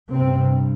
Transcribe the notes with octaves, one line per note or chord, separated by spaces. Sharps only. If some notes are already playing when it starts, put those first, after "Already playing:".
G2 C3 C4